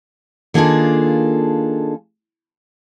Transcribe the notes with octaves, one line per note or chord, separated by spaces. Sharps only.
D#3 A#3 D4 F4 G#4 A4